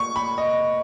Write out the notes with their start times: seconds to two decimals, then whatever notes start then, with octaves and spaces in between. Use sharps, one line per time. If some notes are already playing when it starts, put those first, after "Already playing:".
Already playing: A#2 C#6
0.16 B5
0.38 D#5